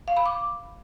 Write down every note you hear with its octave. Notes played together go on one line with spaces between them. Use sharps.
F5
B5
D6